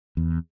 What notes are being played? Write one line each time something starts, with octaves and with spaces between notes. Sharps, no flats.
E2